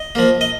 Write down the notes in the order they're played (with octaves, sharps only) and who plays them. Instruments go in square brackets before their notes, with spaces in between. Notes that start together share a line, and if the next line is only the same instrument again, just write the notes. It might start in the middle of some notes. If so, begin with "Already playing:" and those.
Already playing: [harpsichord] D#5
F3 A#3
D#5